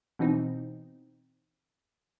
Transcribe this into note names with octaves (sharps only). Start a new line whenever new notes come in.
B2 E3 C4 D#4